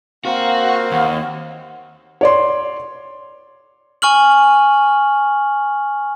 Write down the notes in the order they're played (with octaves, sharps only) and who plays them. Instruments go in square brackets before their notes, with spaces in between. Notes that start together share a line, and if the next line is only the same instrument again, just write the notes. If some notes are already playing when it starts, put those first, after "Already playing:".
[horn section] A#3 C4 F5 [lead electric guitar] F#4
[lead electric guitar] D#2 [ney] F#5
[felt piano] C#5 D5 C6
[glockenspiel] G#5 C#6 F6 F#7